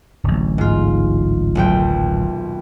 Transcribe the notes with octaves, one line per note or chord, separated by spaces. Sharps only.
D1 A1
G#2 F4
D#1 B1 G5